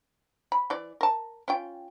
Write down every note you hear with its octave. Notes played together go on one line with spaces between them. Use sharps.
B5
E3 D5
A#4 A5
C#4 F4 G5